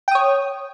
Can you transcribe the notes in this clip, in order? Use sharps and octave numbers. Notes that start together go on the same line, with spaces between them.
C#5 G5 D#6